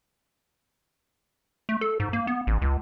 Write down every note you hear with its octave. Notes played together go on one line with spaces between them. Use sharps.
A3
A4
G#2
A#3
B3
A1
C#2